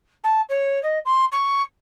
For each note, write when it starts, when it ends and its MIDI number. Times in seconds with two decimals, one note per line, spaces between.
0.24 0.41 81
0.49 0.82 73
0.83 0.99 75
1.05 1.25 84
1.32 1.62 85